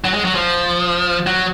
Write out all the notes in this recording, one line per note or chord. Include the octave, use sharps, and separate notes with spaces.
F#3
G#3
F#3
F3
F#3